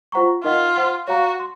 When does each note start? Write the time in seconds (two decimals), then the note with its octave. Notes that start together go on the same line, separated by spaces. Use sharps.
0.12 F4 C5 F#5 A#5 C#6
0.44 D#4 F4 A#4 D#5 F#5
0.76 C5 F#5 C6
1.08 F#4 C#5 F5 A#5 C#6
1.40 C6